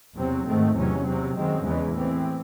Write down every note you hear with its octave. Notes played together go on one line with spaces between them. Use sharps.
E2 C3 F#3 C4
G#2 D#3 A3 C4
E2 C3 F#3 C#4
E2 C3 F#3 C4
F#2 D#3 G#3 C4
E2 C#3 E3 G#3
A2 E3 C4